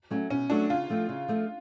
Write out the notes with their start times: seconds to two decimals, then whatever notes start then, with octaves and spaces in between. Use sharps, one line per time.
0.10 F#3 A3 C#4 F#4
0.30 B2 C#4
0.50 F#3 A3 C#4 D4 F#4
0.70 C#3 F4
0.90 F3 A3 C4
1.09 C#3
1.28 F3 A3 C4